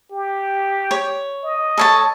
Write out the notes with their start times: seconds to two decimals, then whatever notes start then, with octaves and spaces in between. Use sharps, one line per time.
0.12 G4
0.91 C#5
1.44 D#5
1.78 A4 C#5 A5